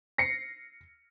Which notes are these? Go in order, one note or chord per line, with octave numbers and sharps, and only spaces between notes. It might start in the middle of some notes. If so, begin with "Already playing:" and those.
A#6 C7 C#7